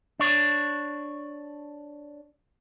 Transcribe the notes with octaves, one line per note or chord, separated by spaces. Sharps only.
D4 C#5